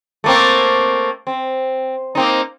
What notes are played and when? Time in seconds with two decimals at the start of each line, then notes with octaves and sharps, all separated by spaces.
0.24 A3 A#3 C4
1.27 C4
2.15 A#3 C4 D#4